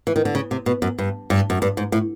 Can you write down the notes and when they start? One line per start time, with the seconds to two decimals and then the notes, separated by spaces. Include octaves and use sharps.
0.07 E3
0.16 D#3
0.25 D3
0.35 C#3
0.51 C3
0.66 B2
0.82 F#2
0.98 G2
1.30 G2
1.50 F#2
1.62 G2
1.77 G#2
1.92 A2